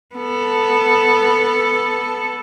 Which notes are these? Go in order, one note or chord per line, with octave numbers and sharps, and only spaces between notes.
B3 A4